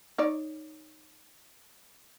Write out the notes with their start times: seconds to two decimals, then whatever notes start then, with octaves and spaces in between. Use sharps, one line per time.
0.18 D#4 C#5 D5